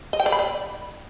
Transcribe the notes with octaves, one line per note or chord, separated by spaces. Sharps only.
D#5
G5
D5
B5
D5